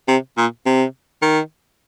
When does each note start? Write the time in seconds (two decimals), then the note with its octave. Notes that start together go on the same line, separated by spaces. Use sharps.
0.08 C3
0.37 A#2
0.66 C3
1.22 D#3